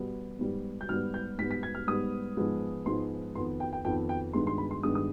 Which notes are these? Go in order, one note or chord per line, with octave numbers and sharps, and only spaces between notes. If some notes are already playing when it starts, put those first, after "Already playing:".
Already playing: B2 G3 B3
G#2 G3 B3
G6
G#2 G3 B3 F6
G6
G#2 G3 B3 B6
B6
G#6
F6
G#2 G3 B3 D#6
G#2 F3 G#3 B3
G#2 F3 G#3 B3 C6
F2 D#3 B3 C6
G5
G5
F2 D#3 B3 G5
G5
G2 D#3 G#3 B3 C6
C6
B5
C6
G2 D#3 G#3 B3 D#6
D#6